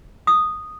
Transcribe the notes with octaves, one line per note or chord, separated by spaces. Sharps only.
D#6